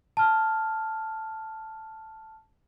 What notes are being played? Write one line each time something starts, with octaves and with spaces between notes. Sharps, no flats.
A5 F6